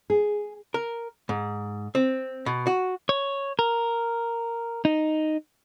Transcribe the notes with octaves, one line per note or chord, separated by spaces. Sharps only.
G#4
A#4
G#2
C4
B2
F#4
C#5
A#4
D#4